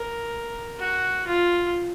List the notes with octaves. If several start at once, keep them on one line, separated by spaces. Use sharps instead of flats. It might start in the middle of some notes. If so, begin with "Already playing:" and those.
Already playing: A#4
F#4
F4